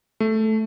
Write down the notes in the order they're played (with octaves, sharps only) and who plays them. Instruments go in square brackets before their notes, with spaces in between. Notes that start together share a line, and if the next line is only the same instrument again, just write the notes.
[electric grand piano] A3